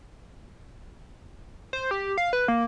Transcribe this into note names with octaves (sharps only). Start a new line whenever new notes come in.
C5
G4
F5
B4
A#3